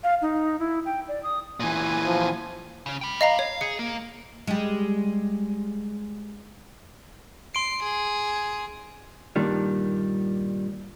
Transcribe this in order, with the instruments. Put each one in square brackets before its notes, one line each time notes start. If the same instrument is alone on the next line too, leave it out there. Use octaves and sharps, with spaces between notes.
[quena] F5
D#4
E4
G5
D5
D#6
[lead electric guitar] A#2 E3 [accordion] G#5
[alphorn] F3
[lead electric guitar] C#3 C#4
G5 B5
[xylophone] D#5 F5 A#5
[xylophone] C#5 [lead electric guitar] F5
[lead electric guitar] G#4 [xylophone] C#7
[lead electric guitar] A#3
[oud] G3 G#3
[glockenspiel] C6 D7 [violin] C7
[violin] G#4
[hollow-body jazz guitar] G2 A#2 D#3 G3